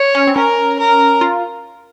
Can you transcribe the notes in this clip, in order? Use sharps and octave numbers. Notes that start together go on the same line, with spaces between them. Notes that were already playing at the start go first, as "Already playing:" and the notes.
Already playing: C#5
C#4
C4
C#4 A#4
A#4
F4